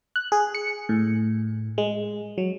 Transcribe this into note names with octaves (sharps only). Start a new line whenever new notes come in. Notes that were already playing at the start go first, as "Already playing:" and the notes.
F#6
G#4
C#7
A2
G#3
F#3